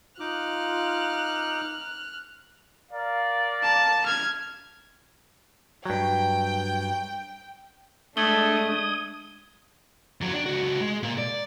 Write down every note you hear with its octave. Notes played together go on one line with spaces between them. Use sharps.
D#4 F4 D6 F6 F#6
A#4 D5 F5
A5
F6 G#6
G2 F#3 G5
G#3 A3 D4 D#6 G#6 F#7 G7
F2 F#3
D4
C#2 F#4
G#3
A#2 A#3
D5